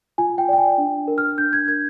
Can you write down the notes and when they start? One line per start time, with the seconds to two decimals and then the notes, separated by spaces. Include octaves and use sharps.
0.18 F4 G#5
0.38 G5
0.49 D5 G5
0.58 G#5
0.78 D4
1.08 A#4
1.18 F6
1.38 D4 G6
1.53 G#6
1.68 A#4 G#6